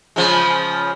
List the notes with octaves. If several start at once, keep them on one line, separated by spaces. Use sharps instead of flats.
C#3 F3 G#3